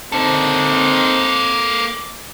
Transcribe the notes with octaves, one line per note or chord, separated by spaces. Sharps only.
A#3 C4 D#4 A4